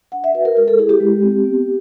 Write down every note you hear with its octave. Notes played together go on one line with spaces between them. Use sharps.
D4 F#5
E5
F#4 B4
A#4
G#3 A#4
A4
E4 G#4
G4
G#3
C4
B3